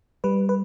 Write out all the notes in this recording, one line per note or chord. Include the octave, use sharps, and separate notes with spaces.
G3 B4
B4